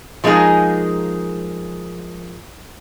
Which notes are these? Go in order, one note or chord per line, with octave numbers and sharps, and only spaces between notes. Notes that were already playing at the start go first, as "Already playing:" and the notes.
F3 G#3 A#3 D#4 G#4